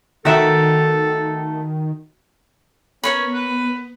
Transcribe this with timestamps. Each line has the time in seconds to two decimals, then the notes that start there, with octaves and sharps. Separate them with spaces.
0.25 D#3 A3 F#4 A4 A#4 E5 F#5
3.04 B3 C#4 A#4 C#5 B5
3.34 B4